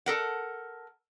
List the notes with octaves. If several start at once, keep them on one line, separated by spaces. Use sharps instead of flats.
A4 A#4 F#5